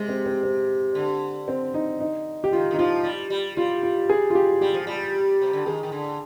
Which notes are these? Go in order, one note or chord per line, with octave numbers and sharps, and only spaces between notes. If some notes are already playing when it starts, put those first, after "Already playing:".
Already playing: C3 G#3
C4
C4
C4
D3
C4
D#4
D#4
G4
D#3 F4
D#3
D#4
F3 F4
G3
G3
G3 F4
F4
G#4
F4
G4
G3 G4
F3
G3
C3
D3
D#3 G#4
D#3
D3